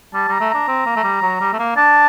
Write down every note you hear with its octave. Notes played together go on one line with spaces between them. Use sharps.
G3 A5
G3 A#5
A3
D4 A#5
C4
A#3
A3
G3
F#3
G3
A3
A#3
D4 A5